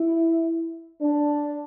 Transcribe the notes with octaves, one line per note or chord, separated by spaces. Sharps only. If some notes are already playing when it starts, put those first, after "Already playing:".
Already playing: E4
D4